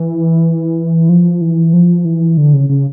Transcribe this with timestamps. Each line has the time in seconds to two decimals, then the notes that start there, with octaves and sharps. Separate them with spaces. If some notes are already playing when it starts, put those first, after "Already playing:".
Already playing: E3
1.09 F3
1.41 E3
1.73 F3
2.05 E3
2.37 D3
2.53 C#3
2.70 C#3